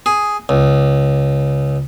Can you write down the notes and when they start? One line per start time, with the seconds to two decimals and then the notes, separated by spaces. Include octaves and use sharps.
0.06 G#4
0.49 C#2